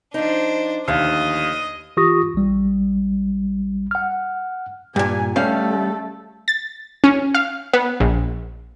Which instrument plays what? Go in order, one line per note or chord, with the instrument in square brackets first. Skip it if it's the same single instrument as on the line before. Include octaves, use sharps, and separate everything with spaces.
[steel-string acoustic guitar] F3 D#4 [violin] D4 C5
[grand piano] D#2 [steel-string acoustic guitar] A2 D3 F3 [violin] D#5
[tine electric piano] E3 F4 G4 C#6 D#6 A#6
A#1 G3
F#5 F6
[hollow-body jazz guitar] G2 A#2 [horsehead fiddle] G#5
[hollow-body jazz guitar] G3 C#4 F5 [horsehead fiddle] A3 A4
[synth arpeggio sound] A6
C#4
F5
B3
A#1